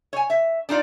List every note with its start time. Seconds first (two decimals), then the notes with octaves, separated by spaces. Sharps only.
0.13 C#5 G#5
0.30 E5
0.69 D4 D#4 F4 D5